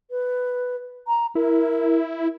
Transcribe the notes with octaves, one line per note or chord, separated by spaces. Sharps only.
B4
A#5
E4 A#4